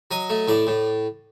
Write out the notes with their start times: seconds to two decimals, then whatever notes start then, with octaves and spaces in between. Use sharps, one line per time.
0.11 F#3 D#5
0.30 A3
0.48 A2 D5
0.67 A2